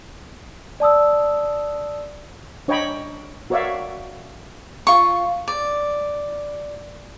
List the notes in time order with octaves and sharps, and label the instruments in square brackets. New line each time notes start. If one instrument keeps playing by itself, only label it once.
[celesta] D5 A5 D#6 E6
[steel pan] D4 C#5 D#5 G5 A#5 B5
F#4 A#4 C#5 D5 E5 F5
[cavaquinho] F4 C#6
D5